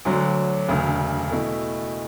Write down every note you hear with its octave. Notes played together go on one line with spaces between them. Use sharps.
D2 D3 F#3
E1 D2 C#3
B2 A3 E4